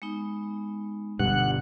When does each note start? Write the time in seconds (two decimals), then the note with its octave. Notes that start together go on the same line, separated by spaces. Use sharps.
0.02 G#3 B3 D#4
1.19 G1 G2 B2 F#5 F#6